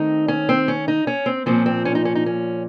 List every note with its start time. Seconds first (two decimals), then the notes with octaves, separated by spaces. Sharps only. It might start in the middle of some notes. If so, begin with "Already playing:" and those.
Already playing: D#3 A3 C4 D#4
0.28 C#4
0.49 C4
0.68 C#4
0.88 D#4
1.07 C#4
1.26 C4
1.46 A#2 F3 C4 C#4
1.66 C4
1.85 C#4
1.95 D#4
2.05 C#4
2.15 D#4
2.26 C#4